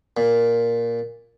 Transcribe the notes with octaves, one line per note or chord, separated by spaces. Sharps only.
A#2